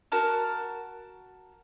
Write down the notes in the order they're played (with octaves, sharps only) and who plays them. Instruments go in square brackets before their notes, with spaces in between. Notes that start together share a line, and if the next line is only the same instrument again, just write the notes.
[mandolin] F#4 A#4 A5 F6